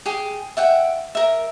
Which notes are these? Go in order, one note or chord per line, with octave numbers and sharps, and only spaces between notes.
G4 G#4 G5
E5 F#5 G5
A#4 E5